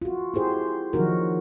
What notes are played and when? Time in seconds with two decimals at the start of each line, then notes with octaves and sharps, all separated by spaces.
0.02 F4 F#4
0.34 E4 G4 G#4 C5
0.93 D#3 F3 F#3 D#4 F#4 A#4